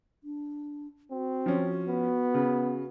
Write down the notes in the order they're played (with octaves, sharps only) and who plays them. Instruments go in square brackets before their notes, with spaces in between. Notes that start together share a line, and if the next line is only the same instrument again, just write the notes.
[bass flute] D4
[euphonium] C4 [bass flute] F#4
[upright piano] F3 C#4
[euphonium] B3
[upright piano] C#3